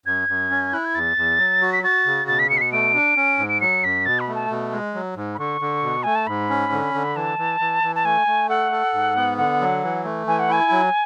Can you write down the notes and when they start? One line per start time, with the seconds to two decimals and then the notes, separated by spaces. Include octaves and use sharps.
0.06 F#2 G#6
0.29 F#2
0.51 C#4
0.73 E4 F#6
0.85 G#6
0.94 E2 A6
1.17 E2
1.39 F#3
1.61 F#4
1.73 B6
1.83 F#4 A6
2.06 C#3
2.28 B2 A6
2.39 B6
2.50 B2 C#7
2.57 B6
2.61 C#7
2.72 A3 D7
2.94 D4
3.17 C#4
3.38 G#2
3.49 D7
3.61 F#3 C#7
3.83 F#2 B6
4.05 B2 A6
4.20 B5
4.28 A3
4.35 A5
4.50 B2
4.72 G#3
4.94 F#3
5.16 G#2
5.34 B5
5.38 D3 C#6
5.61 D3
5.83 B2
6.03 A3 G#5
6.15 A5
6.27 G#2 B5
6.50 C#4
6.72 D3
6.94 D3
7.16 E3 A5
7.38 E3
7.60 E3
7.83 E3
7.95 A5
8.04 A3 G#5
8.27 A3
8.49 A4 F#5
8.72 A4
8.94 G#2
9.16 B3
9.38 D3 F#5
9.61 F#3
9.83 E3
10.04 A3
10.27 E3 G#5
10.39 F#5
10.49 E4 G#5
10.71 F#3